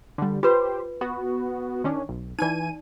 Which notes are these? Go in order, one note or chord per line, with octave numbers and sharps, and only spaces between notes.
D3 G3
F4 G4 B4 C5
B3 F#4
D#3 C#4 D4
B1
E3 D#4 D5 G#5 D#7